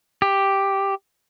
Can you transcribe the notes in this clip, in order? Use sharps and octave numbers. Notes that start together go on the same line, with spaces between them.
G4